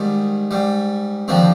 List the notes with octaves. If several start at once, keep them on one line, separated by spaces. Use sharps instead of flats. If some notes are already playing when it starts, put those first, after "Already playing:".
Already playing: G#2 D#3 G3
G#2 G3
D#2 D3 F3 C4